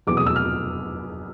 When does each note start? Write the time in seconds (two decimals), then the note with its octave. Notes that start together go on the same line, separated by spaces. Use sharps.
0.07 F1 E2 B2 F#3 D6
0.17 D#6
0.26 E6
0.36 F6